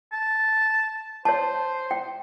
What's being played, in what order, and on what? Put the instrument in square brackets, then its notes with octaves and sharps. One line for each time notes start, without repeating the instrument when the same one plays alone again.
[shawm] A5
[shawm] C5 [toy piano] C#5 A5
[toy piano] G5